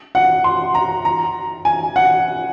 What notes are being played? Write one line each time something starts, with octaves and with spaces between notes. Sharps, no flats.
F#5
C6
A#5
A#5
G#5
F#5